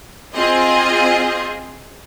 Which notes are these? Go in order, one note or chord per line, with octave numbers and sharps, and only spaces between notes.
C4 F4 G#4 D#5